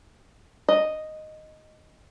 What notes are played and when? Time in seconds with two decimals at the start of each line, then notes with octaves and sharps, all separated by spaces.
0.69 D#5